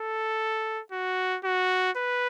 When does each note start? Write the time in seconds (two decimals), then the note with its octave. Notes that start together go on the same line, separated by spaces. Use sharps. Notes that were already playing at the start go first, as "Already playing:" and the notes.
Already playing: A4
0.92 F#4
1.44 F#4
1.96 B4